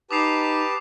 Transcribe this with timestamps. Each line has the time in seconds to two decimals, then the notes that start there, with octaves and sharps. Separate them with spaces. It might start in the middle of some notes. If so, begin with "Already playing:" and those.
0.11 D#4 G4 B4 A5 D6 D#6 C7